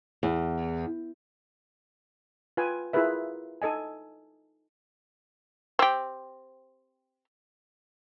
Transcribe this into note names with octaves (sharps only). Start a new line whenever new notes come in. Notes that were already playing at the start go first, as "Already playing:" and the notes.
E2
F4 B4 G5 G#5
E4 F4 G#4 A#4 B4 E5
D#4 A4 D#5 G#5
C4 G4